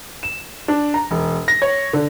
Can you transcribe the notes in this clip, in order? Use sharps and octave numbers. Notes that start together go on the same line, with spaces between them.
E7
D4
A#5
E1
A#6
C#5
D3